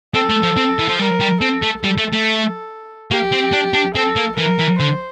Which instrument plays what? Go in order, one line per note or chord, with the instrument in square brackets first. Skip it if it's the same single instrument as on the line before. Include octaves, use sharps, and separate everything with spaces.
[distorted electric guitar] C4 [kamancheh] A4
[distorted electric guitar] A3
F3
C4
E3
F3
[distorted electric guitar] G3 [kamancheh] A#4
[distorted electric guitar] G3
[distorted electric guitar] C4 [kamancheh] A4
[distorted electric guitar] A3
[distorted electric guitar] G3 [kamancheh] A4
[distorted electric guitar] A3
A3
[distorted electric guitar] A#3 [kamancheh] G4
[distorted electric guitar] C4
D4
D4
[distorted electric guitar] C4 [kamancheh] A4
[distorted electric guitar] A#3
[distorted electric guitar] E3 [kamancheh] A#4
[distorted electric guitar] E3
[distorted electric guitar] D3 [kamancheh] C5